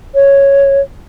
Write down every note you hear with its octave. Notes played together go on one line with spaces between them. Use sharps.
C#5